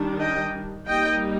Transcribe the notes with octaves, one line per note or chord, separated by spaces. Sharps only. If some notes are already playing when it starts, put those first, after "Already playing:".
Already playing: D#3 G3 D4
D#5 G5
G3 A#3 D#4 D#5 G5